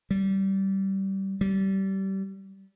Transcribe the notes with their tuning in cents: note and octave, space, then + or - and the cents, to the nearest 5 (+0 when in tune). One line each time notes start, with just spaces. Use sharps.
G3 -20
G3 -25